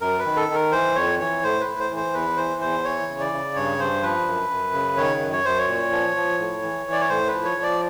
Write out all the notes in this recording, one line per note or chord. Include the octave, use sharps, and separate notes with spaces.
F#2 A#4
B4
D#3
A4
D#3
A#4
E3 C5
F2 C#5
E3 C#5
A2 C5
B4
A2
C5
E3
C5
E2 B4
E3 C5
E2 C5
E3 C#5
C#3
D5
C#3
G2 C#5
G2 C5
F3 B4
F#2
F#2
C#3
D#3 C#5
F#2
C#5
F#2 C5
C#5
A#2
F3
F3
A2
E3
E3
D5
C#5
A2 C5
B4
F3
C#5
F3
D5